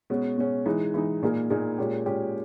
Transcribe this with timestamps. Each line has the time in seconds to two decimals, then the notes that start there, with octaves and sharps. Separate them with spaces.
0.10 B2 G#3 C#4
0.38 B2 G#3 C#4
0.66 E3 G#3 D#4
0.94 E3 G#3 D#4
1.22 A#2 A#3 D#4 G#4
1.50 A#2 A#3 D#4 G#4
1.78 A#2 G#3 C#4 G4
2.06 A#2 G#3 C#4 G4